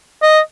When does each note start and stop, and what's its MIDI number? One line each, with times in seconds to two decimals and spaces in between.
0.22 0.39 75